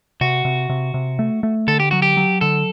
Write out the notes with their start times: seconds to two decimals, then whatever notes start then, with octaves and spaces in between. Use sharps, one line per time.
0.21 C3 F#4
0.45 C3
0.69 C3
0.94 C3
1.19 A3
1.43 A3
1.67 D3 A4
1.80 G4
1.91 F#3 F#4
2.02 G4
2.17 F#3
2.41 D3 A4